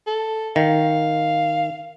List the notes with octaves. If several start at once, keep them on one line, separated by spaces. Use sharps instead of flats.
A4
D#3 F5